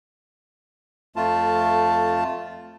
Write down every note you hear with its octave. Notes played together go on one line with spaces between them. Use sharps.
F2 A3 F4 A5